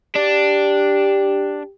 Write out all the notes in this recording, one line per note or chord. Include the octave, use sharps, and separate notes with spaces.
D4 G4